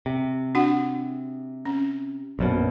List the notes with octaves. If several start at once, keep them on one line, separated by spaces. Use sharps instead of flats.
C3
D4 F#4 F#5
C#4
A#1 F#2 B2